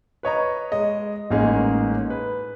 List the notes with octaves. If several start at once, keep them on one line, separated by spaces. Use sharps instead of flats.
B4 C#5 D#5 A#5
G#3 D#5
A1 G#3 A#3 C#4 D#4 G#4
B4